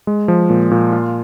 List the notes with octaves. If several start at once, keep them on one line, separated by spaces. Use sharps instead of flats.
G#3
F3
A#2
A#2
F4